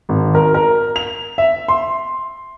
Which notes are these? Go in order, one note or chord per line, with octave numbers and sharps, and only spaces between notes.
G#1
A#4
A#4
F7
E5
C6